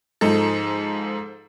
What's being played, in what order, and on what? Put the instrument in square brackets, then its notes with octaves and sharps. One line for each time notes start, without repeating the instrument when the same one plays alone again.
[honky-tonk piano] G#2 F3 D#4 A4